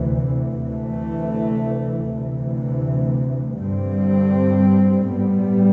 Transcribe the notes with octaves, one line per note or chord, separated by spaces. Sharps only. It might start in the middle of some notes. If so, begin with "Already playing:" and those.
Already playing: D2 C3 E3
D2 C3 E3 A3
D2 C3 E3
G2 D3 G3 C4
A2 G3 B3